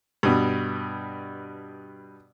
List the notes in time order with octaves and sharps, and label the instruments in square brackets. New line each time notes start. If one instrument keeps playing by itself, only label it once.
[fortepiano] G2 B2